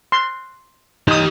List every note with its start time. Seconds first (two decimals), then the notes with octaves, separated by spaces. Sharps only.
0.12 C6
1.08 D#4 G4 D#5 D#6